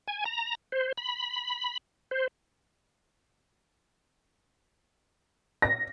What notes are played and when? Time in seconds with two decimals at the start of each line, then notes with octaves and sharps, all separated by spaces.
0.08 G#5
0.25 A#5
0.72 C5
0.98 B5
2.11 C5
5.62 A#6